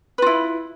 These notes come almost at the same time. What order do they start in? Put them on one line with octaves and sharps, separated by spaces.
B4 F4 E4